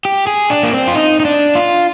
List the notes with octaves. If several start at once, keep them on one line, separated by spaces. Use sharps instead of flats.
G4
G#4
D4
A#3
C4
F4
D#4
D#4
D4
F4